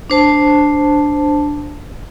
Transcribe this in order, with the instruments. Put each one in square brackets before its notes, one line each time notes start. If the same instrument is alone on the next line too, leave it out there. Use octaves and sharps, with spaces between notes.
[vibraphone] D4 C5 A5